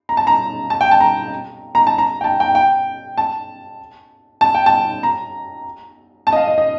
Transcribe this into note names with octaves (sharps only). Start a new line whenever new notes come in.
A#5
A5
A#5
A5
G5
A5
A#5
A#5
A5
A#5
G5
A5
G5
G5
A5
A5
G5
A5
A#5
A5
D#5
F5
D#5
D#5